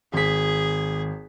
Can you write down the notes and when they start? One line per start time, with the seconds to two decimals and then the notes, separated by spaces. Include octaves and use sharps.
0.14 G#1 G#4 B6